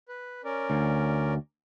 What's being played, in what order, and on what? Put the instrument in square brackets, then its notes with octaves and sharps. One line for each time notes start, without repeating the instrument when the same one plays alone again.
[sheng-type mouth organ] B4
C#4 A#4 D5
[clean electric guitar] D2